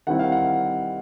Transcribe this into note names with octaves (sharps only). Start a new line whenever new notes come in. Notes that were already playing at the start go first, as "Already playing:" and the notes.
D#3 G3 C4 E4 F#5
F5
F#5